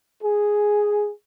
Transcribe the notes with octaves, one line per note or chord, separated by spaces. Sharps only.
G#4